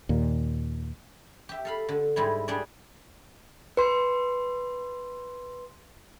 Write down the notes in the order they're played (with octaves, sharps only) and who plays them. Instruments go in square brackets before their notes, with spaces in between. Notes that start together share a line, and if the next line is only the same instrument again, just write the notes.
[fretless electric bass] D#2 A#2
[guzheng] G4 E5
A4 F5 B5
D3
G#2 G3 E4
G3 D4 G#4 D5
[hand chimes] B4 C6